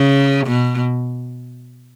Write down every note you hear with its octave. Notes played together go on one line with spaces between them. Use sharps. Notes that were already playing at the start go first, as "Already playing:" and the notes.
Already playing: C#3
B2